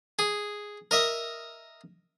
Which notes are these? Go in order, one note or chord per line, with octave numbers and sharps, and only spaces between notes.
G#4
A#4 D#5 E5